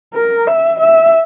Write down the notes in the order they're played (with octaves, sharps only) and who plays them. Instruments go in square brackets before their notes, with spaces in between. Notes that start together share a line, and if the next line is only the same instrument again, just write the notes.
[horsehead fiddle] A#4
E5
E5